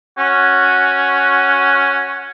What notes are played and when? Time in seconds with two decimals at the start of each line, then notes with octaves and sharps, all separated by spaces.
0.18 C#4 F#4